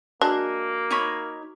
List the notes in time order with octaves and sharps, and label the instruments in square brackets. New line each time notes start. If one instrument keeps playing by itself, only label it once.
[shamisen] G#3 D4 [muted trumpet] A#3 [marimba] F#4
[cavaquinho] D#4 C#5 B5